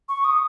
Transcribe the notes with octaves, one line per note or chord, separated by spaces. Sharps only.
C#6
D#6